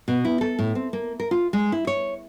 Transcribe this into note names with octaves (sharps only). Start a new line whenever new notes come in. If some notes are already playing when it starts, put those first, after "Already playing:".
B2
E4
A4
A2
C4
A#3
A#4
F4
G#3
E4
C#5